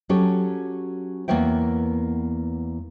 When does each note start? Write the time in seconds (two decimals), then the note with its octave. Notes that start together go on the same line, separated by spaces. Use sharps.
0.09 F#3 C#4 G4 A4 C#5
1.28 E2 A#3 B3 C#5 E5 G5